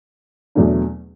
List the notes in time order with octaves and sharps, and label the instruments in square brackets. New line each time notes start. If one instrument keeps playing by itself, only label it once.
[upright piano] E2 B2 F#3 A3 D4